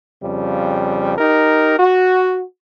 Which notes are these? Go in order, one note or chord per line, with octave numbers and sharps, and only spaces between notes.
F2 C#3 G3
D#4 G4 A#4
F#4